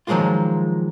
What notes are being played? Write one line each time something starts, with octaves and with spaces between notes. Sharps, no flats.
D#3 F3 F#3 G#3 A#3 F4